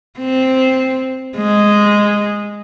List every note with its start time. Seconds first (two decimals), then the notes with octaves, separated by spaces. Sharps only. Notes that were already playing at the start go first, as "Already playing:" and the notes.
0.19 C4
1.37 G#3